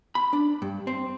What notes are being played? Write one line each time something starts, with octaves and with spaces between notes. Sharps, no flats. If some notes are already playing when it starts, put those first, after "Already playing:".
B5
D4
G2
C4